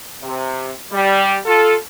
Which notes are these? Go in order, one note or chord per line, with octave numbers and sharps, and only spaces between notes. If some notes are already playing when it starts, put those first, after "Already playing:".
C3
G3
F4 A4